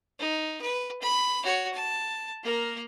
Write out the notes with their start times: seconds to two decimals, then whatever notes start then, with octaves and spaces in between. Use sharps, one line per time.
0.19 D#4
0.61 B4
1.02 B5
1.43 F#4 C#5
1.74 A5
2.43 A#3 A#4